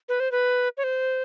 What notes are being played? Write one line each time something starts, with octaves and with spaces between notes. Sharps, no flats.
B4
C5
B4
C#5
C5